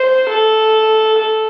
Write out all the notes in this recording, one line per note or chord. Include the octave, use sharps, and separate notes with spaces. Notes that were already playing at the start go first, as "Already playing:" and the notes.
Already playing: C5
A4
A4